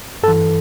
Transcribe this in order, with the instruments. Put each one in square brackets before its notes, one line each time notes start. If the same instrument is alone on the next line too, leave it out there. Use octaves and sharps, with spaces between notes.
[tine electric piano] G2 A4
E3